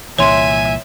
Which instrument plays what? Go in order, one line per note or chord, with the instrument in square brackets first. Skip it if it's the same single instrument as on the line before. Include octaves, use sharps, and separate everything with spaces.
[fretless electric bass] C2 A#2 E3 [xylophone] C#5 C6 [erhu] E5 [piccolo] G#5